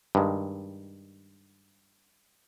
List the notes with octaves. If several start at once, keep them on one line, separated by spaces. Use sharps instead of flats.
G2 D#3 G#3